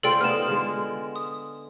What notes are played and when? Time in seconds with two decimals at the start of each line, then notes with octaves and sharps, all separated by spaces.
0.03 C#3 F4 A4 C5 D5 G5
0.21 B3 D#4 F4 F6 E7
0.48 D3 G#3
1.16 D#6